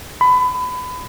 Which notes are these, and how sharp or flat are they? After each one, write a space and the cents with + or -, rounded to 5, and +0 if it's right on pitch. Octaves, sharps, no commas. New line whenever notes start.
B5 +25